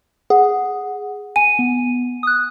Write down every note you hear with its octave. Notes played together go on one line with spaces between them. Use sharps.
G#4 F#5
G#5 D#7
B3
D#6 F#6